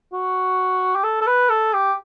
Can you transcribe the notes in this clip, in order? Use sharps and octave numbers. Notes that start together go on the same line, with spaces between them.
F#4
G4
A4
A4
B4
A4
G4